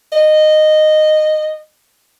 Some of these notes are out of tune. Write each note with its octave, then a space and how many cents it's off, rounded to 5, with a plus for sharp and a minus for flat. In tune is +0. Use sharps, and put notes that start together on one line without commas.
D#5 -10